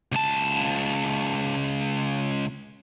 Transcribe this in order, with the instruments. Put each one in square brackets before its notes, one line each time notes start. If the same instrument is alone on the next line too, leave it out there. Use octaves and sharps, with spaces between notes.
[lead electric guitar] C#2 A5